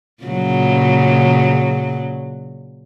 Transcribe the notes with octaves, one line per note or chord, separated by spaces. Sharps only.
A#2 C#3 F#3